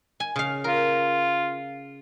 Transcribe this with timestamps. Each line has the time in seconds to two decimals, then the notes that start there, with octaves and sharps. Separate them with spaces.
0.20 G#5
0.36 C#3 F5
0.64 F4 A#4